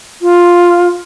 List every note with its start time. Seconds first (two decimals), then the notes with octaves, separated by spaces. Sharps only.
0.22 F4